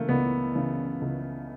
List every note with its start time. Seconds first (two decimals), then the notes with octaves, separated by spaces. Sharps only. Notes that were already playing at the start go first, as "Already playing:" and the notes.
Already playing: C#3 E3 A3 A#3
0.09 C#2 B3
0.55 C#3 E3
1.01 C#2